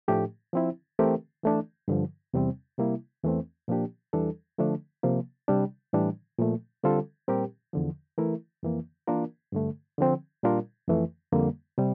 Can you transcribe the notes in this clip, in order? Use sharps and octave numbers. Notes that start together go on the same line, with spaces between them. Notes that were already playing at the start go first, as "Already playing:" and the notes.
A2 F3 A3 D4 G4
F3 C4 E4
E3 A3 C4 G4 A#4
E3 A3 D4
G2 D3 F3
E2 C3 G3 C4
C3 G3 A#3 E4
E2 E3 A3 C4
A#2 F3 A#3 D4 G4
E2 E3 G3 D4 A4
D3 F3 A3 D4
C3 F3 A#3
C3 G3 D4
A2 E3 G3 D4
A#2 F3 A3
D3 G3 C4 F4 A4
A#2 G3 C4 G4 A#4
E2 D3 F3
E3 A3 E4 A#4
F2 E3 A#3
E3 A#3 D4 F4 A#4
G2 D3 A3
D3 F3 C4
A#2 G3 D4 F4 A#4
F2 E3 A3
F2 D3 G3 A#3
C3 G3